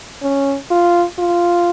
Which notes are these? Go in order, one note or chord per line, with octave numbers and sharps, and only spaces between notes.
C#4
F4
F4